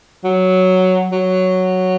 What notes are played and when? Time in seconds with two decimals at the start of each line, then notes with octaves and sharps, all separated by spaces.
0.24 F#3
1.12 F#3